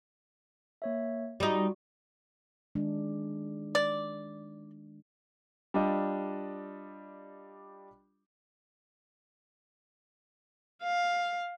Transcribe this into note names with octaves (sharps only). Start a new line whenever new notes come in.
A#3 C#5 E5
G3 D#4 F4 F#4 D5
D#3 G#3 D4
D5
G3 D4 F4 G4 D#5
F5